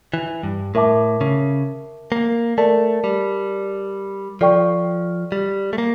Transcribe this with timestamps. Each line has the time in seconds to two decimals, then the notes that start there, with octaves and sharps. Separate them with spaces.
0.14 E3
0.43 G2
0.75 A2 A#4 E5 A5 D6
1.21 C#3
2.12 A#3
2.58 A3 A#4 D5 A5
3.04 G3
4.41 F3 A4 D5 G5 C#6
5.32 G3
5.73 A3
5.78 A#3